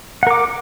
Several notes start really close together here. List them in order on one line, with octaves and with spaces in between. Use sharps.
F#5 A#4 D6